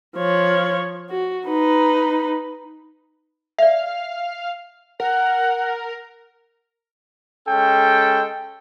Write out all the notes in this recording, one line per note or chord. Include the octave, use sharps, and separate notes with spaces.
F3 C#5
F#4
D#4 B4
D5 E5 F5
A#4 F#5
G#3 C#4 A4 G5